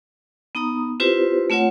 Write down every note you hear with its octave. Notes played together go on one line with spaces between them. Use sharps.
B3 D#4 A#5 D#6
C4 E4 F4 G4 B4 C5
A3 C4 F4 C#5 F#5